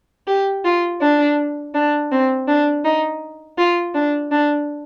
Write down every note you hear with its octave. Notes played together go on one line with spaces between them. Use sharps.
G4
F4
D4
D4
C4
D4
D#4
F4
D4
D4